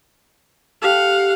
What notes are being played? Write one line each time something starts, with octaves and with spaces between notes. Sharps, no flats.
G4 A4 F5 F#5